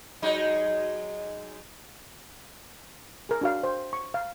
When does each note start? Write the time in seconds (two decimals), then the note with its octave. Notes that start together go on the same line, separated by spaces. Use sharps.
0.22 F#3 G#3 D#4
3.29 G#4 A#4
3.41 D4 F#4 F5
3.63 C5
3.93 C#6
4.14 F5